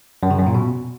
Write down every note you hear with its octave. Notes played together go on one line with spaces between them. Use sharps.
F#2
C#3
F#2
A#2
B2